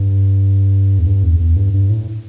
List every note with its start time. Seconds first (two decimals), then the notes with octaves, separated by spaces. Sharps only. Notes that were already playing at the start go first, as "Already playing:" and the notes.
Already playing: G2
0.99 E2
1.06 G2
1.23 E2
1.39 E2
1.56 G2
1.74 G2
1.90 A2